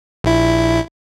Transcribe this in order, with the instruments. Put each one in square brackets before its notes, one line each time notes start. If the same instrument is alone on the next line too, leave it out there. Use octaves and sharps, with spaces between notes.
[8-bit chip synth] A#1 E4